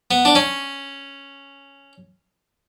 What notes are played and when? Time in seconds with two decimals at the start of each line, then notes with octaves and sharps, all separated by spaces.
0.11 B3
0.25 D4
0.35 C#4